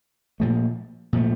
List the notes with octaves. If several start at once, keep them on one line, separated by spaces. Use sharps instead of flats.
A#2 F3 A3
A#2 F3 A3